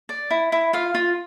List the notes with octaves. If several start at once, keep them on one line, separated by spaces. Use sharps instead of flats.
D5
E4
E4
F4 F5
F4